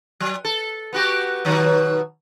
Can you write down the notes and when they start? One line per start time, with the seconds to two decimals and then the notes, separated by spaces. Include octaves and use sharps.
0.20 F#3
0.45 A4
0.93 B3 F#4 G4
1.45 B2 D#3 F#3